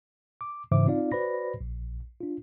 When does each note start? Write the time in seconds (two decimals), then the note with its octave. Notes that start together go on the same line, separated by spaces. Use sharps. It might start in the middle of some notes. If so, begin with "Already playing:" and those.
0.41 D6
0.71 G#2 C#3 E3 C5 E5 D6
0.87 C4 D#4 F4 D5 F5
1.12 F#4 B4 C5 D5 B5 A#6
1.61 A#1
2.20 D4 F4